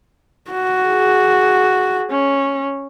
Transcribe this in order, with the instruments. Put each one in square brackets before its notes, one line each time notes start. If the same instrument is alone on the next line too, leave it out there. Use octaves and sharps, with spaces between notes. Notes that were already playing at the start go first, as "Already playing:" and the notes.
[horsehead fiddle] F#4
[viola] G#4
C#4